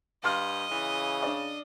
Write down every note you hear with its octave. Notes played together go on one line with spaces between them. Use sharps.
G2 D#5 F5 C6 F6
C#3 E3
D4 D5